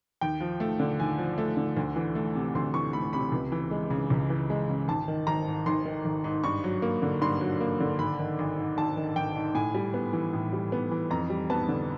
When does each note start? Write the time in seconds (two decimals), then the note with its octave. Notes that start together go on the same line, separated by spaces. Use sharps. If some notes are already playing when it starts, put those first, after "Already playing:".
0.21 D#2 G5
0.40 F3
0.60 A3
0.80 D3
1.00 D#2 G#5
1.18 F3
1.38 A3
1.57 D3
1.77 D2
1.96 E3
2.15 A3
2.35 C3
2.55 D2 C6
2.74 E3 C#6
2.93 A3 B5
3.13 C3 B5
3.32 C#2
3.52 E3
3.71 G#3
3.90 C#3
4.10 C#2
4.30 E3
4.50 G#3
4.69 C#3
4.88 G#1 A5
5.08 D#3
5.27 G#1 A#5
5.47 G#2
5.66 G#1 C6
5.85 D#3
6.05 G#1
6.24 G#2
6.44 G2 C#6
6.64 F#3
6.82 A#3
7.02 D3
7.21 G2 C6
7.41 F#3
7.60 A#3
7.80 D3
7.99 G#1 B5
8.19 D#3
8.39 G#1
8.58 G#2
8.77 G#1 A5
8.97 D#3
9.16 G#1 G5
9.36 G#2
9.54 A2 G#5
9.74 G3
9.94 B3
10.13 E3
10.33 A2
10.53 G3
10.72 B3
10.91 E3
11.10 F2 A#5
11.30 G3
11.50 B3 A5
11.68 D3